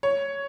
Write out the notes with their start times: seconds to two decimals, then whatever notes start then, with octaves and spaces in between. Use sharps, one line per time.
0.03 C#5